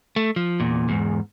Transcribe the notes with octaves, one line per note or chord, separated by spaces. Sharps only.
A3
F3
E2 A#2
E2 G#2